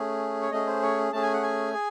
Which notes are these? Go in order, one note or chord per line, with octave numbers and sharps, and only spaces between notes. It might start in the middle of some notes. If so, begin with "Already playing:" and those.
Already playing: A3 C#4 G#4
C#5
A3 C#4 G#4 D#5
C5
C#5
A3 C#4 G#4 A5
G#5
F#5
G#5
G#4